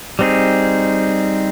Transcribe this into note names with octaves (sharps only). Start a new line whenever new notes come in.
G3 C4 D#4 G#4